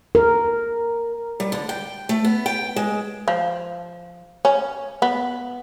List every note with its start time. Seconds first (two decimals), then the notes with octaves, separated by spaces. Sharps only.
0.15 A#4
1.40 G3
1.52 D3
1.69 G5
2.09 A3
2.25 B3
2.46 G5
2.76 G#3
3.28 F3
4.45 C#4
5.02 B3